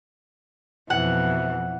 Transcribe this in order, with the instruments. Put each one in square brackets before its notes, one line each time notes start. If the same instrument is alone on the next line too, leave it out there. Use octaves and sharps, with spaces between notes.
[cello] F2 B2 [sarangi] E3 [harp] F#5